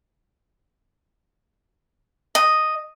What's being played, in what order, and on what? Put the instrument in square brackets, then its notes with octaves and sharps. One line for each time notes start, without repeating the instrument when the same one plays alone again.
[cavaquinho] D#5